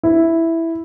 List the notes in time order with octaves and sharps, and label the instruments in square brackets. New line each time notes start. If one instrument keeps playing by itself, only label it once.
[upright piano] E4